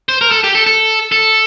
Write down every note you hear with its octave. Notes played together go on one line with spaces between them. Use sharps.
C5
A#4
A4
G4
A4
A4
A4